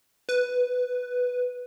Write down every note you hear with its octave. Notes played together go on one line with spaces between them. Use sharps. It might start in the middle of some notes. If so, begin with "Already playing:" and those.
B4